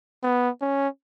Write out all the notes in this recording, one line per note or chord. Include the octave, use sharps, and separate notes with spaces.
B3
C#4